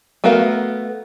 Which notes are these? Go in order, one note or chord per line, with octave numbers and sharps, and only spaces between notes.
A3 B3 F#4 A#4 F5